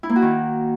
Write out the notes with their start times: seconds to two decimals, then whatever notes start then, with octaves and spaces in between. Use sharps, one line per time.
0.03 E4
0.09 A#3
0.16 F#4
0.22 D#3